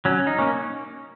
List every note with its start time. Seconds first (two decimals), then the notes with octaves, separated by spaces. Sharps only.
0.05 F#3 C#4
0.27 D#4
0.39 A#3 C#4